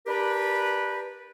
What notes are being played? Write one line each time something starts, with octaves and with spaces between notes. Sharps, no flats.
D4 G4 A#4 B4